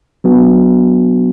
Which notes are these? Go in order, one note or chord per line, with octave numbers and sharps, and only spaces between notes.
F#3 B3 D4 F#4